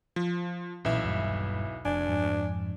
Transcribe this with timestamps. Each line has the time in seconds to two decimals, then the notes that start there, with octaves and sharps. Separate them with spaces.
0.16 F3
0.85 B1 A#2 E3 C#4 E5
1.05 D#1 G2
1.85 F1 D4 G#5
2.08 F2 G#2